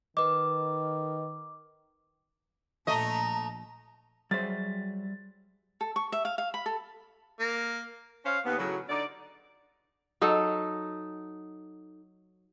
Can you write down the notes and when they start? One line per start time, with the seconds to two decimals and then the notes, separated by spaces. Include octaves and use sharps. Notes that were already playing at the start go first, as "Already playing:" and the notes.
0.17 D#3 B4 D#5 D6
2.87 A#1 A3 D#5 A5 A#5
4.31 F#3 G3 G#4 C5 E5 A6
5.81 A4
5.96 C#6
6.12 E5
6.25 F5
6.38 F5
6.54 B5
6.66 A4
7.40 A#3
8.25 C#4 C5 C#5 F5
8.45 D#2 B3
8.58 A2 C#3 F#3
8.89 D3 D#4 D5
10.21 F#3 D#4 A4